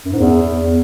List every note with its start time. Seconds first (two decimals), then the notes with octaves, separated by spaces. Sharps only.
0.05 F#2
0.12 G#2
0.19 E2